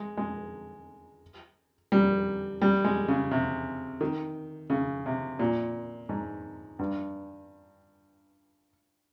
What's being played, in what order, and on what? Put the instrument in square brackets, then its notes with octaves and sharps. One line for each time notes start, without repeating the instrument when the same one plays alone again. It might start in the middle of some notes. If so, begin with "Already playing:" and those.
Already playing: [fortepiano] G#3
G#3
G3
G3
G#3
C#3
C3
D#3
C#3
C3
A#2
G#2
G2